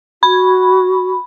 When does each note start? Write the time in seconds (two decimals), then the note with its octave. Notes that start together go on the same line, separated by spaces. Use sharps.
0.23 F#4 B5